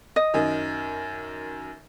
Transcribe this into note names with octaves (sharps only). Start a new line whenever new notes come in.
D#5
F#2 D#3